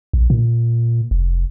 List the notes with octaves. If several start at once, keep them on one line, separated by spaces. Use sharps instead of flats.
A#1
A#2
F1